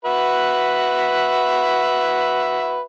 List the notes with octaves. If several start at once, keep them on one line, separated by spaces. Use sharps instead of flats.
F#4 B4 E5